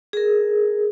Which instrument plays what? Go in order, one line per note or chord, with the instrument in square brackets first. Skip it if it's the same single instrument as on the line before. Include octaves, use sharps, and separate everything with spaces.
[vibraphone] G#4 A#4